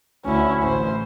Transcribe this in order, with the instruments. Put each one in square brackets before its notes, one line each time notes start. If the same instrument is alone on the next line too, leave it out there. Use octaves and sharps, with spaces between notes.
[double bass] D2 [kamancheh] C#4 E4
[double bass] A1 [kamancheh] C5